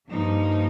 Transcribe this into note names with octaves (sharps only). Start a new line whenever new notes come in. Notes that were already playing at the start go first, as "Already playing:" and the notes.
G2 F3 A#3 D#4